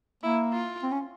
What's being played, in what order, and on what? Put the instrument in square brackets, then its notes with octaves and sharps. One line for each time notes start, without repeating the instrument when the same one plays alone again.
[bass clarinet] A#3 [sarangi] E4
[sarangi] F4
[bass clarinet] C4
C#4